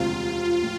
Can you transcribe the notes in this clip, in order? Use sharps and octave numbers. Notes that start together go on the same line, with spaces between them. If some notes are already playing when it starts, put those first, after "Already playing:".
Already playing: E1 D2 C3 F3 C4 F4
A2 F3